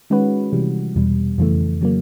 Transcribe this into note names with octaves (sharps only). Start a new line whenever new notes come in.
D#3 G#3 C#4 F#4 B4
C3 E3 G3
E2 B2 G3
F2 C#3 E3 A3
C#3 F#3 A#3